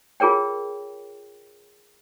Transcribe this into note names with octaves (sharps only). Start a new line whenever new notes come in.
F4 G#4 A#4 C#5 G5